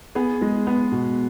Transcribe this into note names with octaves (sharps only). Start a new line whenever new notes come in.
B3 G#4
G#3
B3
B2